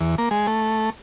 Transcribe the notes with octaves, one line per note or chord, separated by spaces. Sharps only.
E2
A#3
G#3
A3